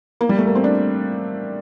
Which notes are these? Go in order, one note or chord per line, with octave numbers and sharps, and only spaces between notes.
A#3
G3
A3
A#3
C4
D4